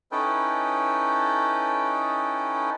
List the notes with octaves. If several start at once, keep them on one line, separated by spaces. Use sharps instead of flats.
C#4 D#4 E4 A4 B4 G5